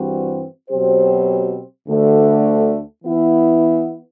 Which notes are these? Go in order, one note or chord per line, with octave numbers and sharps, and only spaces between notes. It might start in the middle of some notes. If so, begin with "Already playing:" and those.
Already playing: G2 E3 G3 C4 F#4
B2 F#3 C4 G4 C5
D2 D3 A3
E3 B3 E4